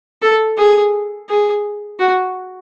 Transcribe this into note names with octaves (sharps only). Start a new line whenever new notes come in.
A4
G#4
G#4
F#4